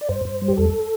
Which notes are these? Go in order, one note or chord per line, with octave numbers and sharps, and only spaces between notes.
D5
G2 C5
G2
G3
G4
E2 A4